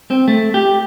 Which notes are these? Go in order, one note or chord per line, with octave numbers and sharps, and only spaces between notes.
C4
A3
G4